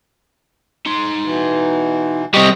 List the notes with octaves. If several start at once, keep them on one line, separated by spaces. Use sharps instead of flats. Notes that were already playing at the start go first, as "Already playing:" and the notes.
D#4 C6
B2 E3
G3 C4 D#5 C#6